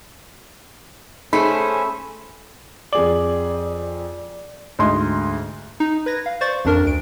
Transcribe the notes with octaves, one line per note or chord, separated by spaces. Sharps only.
A3 C#4 D#4 G#4 A4 C5 G#5 B5
F2 G#4 D5 F#7
D2 G#2 D#5 C6
D#4
B4 G#6 A#6
F5
C5 D5 C#6 A6
A1 F2 D4 A#4
D2 D7